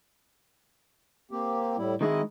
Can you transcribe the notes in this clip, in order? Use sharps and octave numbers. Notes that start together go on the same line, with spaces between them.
A#3 C4 G4
A2 G3 E4
D#3 G#3 E4 D#5